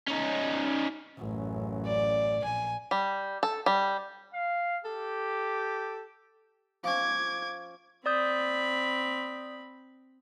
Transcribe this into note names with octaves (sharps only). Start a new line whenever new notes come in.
C#4 D#4
A1 F#2
D5
A#1 G#5
G3
A4
G3
F5
G4 A4
F3 C#4 D6 G#6
C4 D5 B5 D#6 G6